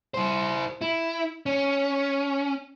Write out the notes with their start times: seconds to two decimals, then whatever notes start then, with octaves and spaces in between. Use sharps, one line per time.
0.14 E4 C5
0.81 E4
1.46 C#4